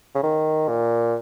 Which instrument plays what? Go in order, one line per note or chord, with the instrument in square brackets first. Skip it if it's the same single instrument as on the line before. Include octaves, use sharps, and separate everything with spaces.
[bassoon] C#3
D#3
A#2